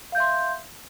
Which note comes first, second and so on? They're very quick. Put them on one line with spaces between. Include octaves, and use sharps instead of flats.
F5 G6 E5 C6